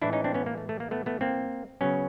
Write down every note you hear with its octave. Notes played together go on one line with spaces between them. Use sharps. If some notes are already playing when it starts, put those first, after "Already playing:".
A2 E3 G#3 D4 E4
C#4 D#4
C4 D4
B3 C#4
A#3
A3
A3
A#3
A3 B3
A3 B3
A#3 C4
C#3 F#3 B3 C#4